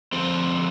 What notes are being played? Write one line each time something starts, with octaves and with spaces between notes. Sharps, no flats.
D3 F3 C4